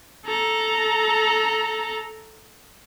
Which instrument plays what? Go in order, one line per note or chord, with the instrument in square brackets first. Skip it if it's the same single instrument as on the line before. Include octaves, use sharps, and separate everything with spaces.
[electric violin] A4 A#5